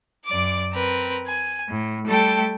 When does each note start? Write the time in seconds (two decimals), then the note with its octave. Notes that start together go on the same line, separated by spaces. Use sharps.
0.25 F#2 D5 D6
0.72 C4 A#4 B4
1.27 G#5
1.68 A2
2.06 G3 A3 A4 G5 A5